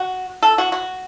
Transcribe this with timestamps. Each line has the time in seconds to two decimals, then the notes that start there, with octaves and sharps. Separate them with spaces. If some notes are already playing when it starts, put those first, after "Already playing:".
Already playing: F#4
0.43 A4
0.58 F#4
0.72 F#4